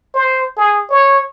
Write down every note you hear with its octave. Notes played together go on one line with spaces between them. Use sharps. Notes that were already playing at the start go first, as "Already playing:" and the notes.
C5
G#4
C#5